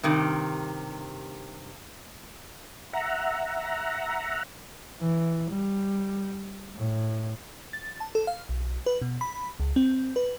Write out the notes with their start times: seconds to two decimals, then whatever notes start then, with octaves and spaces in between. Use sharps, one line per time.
0.03 G2 C3 D#3
2.93 E5 F#5 A#5
5.01 E3
5.51 G3
6.76 A2
7.73 A6
8.00 A5
8.15 A4
8.27 F5
8.49 B1
8.86 B4
9.02 B2
9.21 B5
9.60 C#2
9.76 C4
10.16 B4